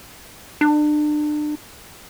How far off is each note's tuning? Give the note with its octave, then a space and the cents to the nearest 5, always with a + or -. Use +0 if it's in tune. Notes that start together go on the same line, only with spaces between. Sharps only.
D4 +35